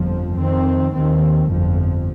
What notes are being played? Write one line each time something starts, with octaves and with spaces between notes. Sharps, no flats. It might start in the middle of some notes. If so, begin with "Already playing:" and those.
Already playing: G1 F2 F3
F2 D#3 C4
D#2 D#3 C4
G1 F2 F3